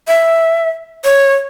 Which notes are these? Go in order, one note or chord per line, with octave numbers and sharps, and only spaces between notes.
E5
C#5